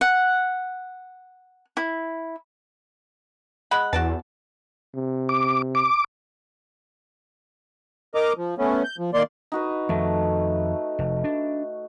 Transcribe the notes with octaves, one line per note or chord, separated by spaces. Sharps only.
F#5
E4
G#3 F#5 B5
E2 F#4 D5 A5
C3
D6
D6
A#4 D#5 A#5 D6
F3
A3 B3 C#4
G6
F3
D#3 A#3 D5 C6
D#4 F#4 B4
F2 D#3 A3
F1
D4